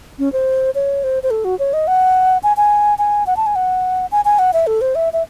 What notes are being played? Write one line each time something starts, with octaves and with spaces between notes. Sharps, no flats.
C#4
C5
C#5
C5
C5
A4
F#4
C#5
D#5
F#5
G#5
G#5
G#5
F#5
A5
G#5
F#5
G#5
G#5
F#5
E5
A4
C5
E5
E5